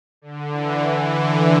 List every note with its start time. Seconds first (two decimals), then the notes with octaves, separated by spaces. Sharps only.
0.22 D3
0.52 E3
0.82 E3
1.11 D3